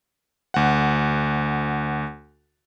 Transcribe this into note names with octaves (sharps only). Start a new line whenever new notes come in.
D2 F#5